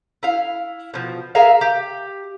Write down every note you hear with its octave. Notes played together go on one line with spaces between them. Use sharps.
E4 F5
B2 F3
G#4 A#4 E5 F5
G4